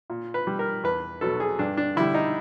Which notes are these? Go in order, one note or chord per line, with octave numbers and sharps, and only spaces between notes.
A#2
B4
G3
A#4
E2 B4
B2 F#3 A4
G#4
G2 D4
D4
D3 G3 E4
D#4